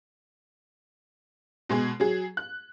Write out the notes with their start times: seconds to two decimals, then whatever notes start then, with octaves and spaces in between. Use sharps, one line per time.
1.69 B2 G#3 G#4
2.00 F#3 G#4
2.37 F#6